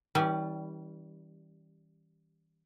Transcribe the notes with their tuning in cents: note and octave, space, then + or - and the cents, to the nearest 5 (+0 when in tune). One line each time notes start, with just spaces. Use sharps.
E3 -45 G3 -10 C#4 -10